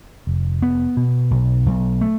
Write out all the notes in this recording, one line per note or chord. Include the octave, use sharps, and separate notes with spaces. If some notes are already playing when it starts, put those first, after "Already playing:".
F1
B3
B2
B1
B1
A3